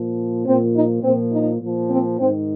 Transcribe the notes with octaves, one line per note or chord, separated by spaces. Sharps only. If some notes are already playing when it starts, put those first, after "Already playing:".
Already playing: A#2 F3
A#2 F3 C4
D#4
A#2 F3 C4
D#4
A#2 F3
C4
G#2 D#3 C4